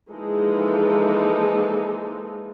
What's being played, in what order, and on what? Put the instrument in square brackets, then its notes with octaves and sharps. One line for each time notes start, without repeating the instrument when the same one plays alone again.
[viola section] E3 F3 G#3 A#3 D#4 A4